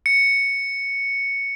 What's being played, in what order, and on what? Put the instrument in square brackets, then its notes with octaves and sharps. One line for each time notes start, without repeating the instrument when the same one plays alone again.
[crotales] C#7